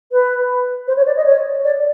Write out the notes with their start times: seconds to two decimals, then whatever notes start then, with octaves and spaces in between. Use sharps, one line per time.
0.12 B4
0.87 C5
0.96 C#5
1.06 D5
1.16 D#5
1.25 C#5
1.64 D5